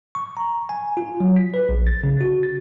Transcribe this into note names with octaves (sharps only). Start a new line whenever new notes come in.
C#6
A#5
G#5
F4
F#3
B6
B4
A#1
A6
C#3
F#4
A6